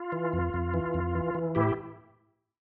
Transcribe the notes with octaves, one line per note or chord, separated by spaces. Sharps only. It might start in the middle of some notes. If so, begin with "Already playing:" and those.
Already playing: F4
E3
F2
F2
E3
F2
E3
E3
A2 E4 G4